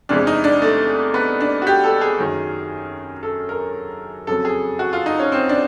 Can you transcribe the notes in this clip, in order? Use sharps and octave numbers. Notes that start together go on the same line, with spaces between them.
E2 C3 E3 G#3 D4
D#4
D4
A3
B3
D4
F#4
G4
A4
G#4
F#2 D#3 F#3
A4
A#4
F2 C#3 F#3 A4
G#4
F#4
F4
D#4
C#4
C4
D4